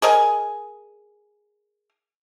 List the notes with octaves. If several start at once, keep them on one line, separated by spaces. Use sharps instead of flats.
G#4 A#4 D#5 G#5